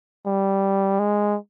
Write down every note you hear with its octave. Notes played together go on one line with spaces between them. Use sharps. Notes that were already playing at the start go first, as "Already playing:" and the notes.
G3
G#3